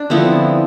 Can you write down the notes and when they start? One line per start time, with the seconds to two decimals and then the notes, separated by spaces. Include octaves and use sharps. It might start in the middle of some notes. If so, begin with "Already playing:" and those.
Already playing: D4
0.10 D3 F3 B3 C4 E4